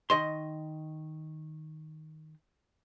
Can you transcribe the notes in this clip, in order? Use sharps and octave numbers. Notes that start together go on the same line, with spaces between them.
D#3 D#5 C6